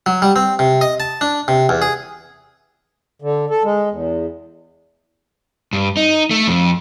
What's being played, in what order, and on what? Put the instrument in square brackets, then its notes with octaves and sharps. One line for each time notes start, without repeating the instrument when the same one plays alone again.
[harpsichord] F#3
G3
C4
C3
D#5
A5
D4
C3
E2
G#4
[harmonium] D3
A4
G#3
E2
[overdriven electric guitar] G2
D#4
A3
F2